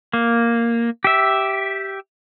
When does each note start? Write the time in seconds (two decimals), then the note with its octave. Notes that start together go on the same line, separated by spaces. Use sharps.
0.13 A#3
1.04 G4 E5